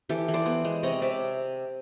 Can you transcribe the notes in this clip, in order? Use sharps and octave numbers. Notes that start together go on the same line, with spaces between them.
E3 G4 A4
E3
C5 D5
B3
G#3
C3 C#5 D#5
C3 D5 E5